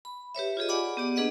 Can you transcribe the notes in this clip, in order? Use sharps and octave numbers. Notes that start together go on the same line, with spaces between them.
B5
G4 B4 C#5 E5
F4 G4 G#4 D#5
D5 F#5 G#5 B5 D6
B3 G4 D5
A#3 D4 G#4 B4 D#5 F#5